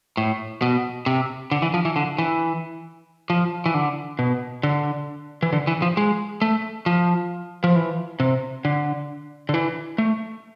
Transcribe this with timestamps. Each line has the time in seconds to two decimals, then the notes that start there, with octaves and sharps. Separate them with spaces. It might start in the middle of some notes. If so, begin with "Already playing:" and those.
0.17 A2
0.62 B2
1.06 C3
1.51 D3
1.62 E3
1.74 F3
1.85 E3
1.96 D3
2.18 E3
3.30 F3
3.66 E3
3.74 D3
4.19 B2
4.63 D3
5.42 E3
5.53 D3
5.67 E3
5.82 F3
5.97 G#3
6.42 A3
6.86 F3
7.64 F3
7.76 E3
8.20 C3
8.65 D3
9.49 D3
9.54 E3
9.98 A3